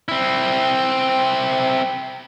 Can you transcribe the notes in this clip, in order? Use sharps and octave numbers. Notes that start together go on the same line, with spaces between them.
C4 E4